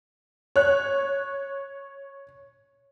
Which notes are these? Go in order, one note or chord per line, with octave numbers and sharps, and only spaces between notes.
C#5 F#6